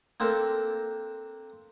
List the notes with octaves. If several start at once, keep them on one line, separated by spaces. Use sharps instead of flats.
A#3 C4 D4 A4 A#4